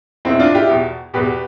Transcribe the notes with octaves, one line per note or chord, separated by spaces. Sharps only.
E2 B2 C4 E4
D4 F4
E4 G4
E2 B2
E2 B2 G4 B4